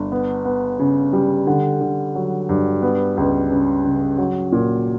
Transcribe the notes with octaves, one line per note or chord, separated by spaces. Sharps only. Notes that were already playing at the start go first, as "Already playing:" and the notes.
Already playing: G1
B3
B3
C#3
G3
D3
D3
F#3
G2
B3
C#2
C#3
C#3
F#3
A#2